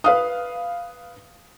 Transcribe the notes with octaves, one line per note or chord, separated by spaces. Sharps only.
B4 F5 D#6